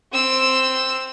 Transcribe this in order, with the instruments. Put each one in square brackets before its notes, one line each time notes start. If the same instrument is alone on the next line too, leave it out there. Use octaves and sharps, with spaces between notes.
[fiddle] C4 E6